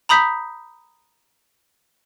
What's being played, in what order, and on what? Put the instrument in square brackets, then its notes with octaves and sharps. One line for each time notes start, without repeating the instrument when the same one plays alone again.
[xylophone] A#5 B5 D#6 G6 B6